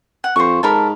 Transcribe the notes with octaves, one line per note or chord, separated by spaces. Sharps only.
F#5
F2 C5 C#6
G#2 A4 A#4 B5